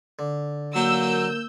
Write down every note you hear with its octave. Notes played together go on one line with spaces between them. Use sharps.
D3
F#3 A#3 E6 G6